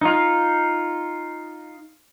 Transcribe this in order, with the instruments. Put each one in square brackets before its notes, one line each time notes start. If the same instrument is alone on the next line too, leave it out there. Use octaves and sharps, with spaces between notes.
[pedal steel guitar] D#4 F4